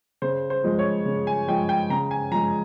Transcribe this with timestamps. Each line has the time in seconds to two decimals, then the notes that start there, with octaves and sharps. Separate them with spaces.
0.22 C#3 C5
0.50 C5
0.64 F3 G#3
0.79 C#5
1.06 C#3
1.27 G#5
1.48 F3 G#3 G5
1.69 G5
1.90 C#3 A#5
2.11 G#5
2.31 F3 A#5
2.35 G#3